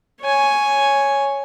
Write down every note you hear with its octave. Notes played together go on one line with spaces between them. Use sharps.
C#5 G#5